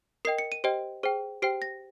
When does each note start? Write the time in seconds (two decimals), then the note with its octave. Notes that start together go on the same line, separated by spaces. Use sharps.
0.25 A#4 D#5 G5 C7
0.38 C#7
0.52 D#7
0.64 G4 C5 D#5 G5
1.03 G#4 C5 G5
1.42 G4 C5 G5 C7
1.62 A#6